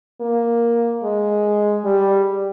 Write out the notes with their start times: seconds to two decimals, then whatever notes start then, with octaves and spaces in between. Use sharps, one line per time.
0.21 A#3
1.03 G#3
1.85 G3